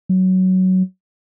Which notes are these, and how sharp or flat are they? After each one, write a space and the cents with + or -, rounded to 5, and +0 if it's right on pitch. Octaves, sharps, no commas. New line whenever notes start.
F#3 +10